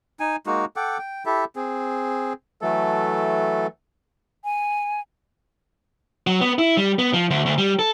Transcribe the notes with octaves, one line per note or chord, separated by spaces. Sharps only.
D#4 G#5
G#3 A#3 D#4 F#4
A4 F#5 G5 D6
G5
E4 G4 A4 E5
C4 G#4
E3 F#3 A3 A4
G#5
F#3
B3
E4
G3
B3
F3
D2
D2
G3
A4